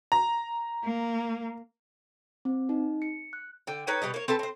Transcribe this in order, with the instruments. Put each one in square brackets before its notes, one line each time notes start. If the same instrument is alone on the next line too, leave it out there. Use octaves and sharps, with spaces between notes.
[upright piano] A#5
[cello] A#3
[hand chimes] C4
D#4
C#7
F#6
[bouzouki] D3 G5
D#4 B4 C#5 G5
B2 G3 B4 D#5
A#3 C#5
C4 A4 B4 A5
C4 C5